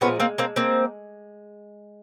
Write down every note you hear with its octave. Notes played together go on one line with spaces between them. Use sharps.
A#2 F3 G#3 B3 C#4
A#3 C4
A#3 C4
A#3 C4